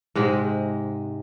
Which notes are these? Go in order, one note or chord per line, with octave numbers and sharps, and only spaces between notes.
G#2 C3 G#3